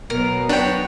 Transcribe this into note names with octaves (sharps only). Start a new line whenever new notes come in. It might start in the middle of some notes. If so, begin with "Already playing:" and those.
B2 F#3 B3 A#4
D4 F#4 B4 C#5 G5